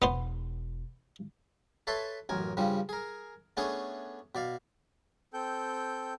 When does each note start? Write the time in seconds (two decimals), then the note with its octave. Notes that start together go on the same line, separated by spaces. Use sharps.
0.02 E1 B3 B4 C5
1.87 A4 B4 C#5 E5 A5 C6
2.29 A1 F#2 A#4 G#5
2.57 G2 C#3 F3 G3
2.89 G#4 A#4
3.57 A3 B3 C#4 D4 G#4 C#5
4.35 B2 D5 F5
5.34 C4 A4 G5 G6